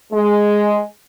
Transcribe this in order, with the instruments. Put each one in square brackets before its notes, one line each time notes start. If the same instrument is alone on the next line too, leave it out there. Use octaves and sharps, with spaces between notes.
[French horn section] G#3